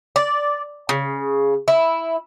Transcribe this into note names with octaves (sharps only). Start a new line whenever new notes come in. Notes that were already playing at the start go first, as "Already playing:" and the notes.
D5
C#3
E4